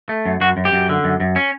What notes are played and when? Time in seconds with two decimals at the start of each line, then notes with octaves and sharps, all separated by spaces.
0.09 A3
0.26 F#2
0.41 F#2 F#4
0.57 F#2
0.65 G4
0.72 F#2
0.89 D3
1.04 F#2
1.20 F#2
1.36 C#4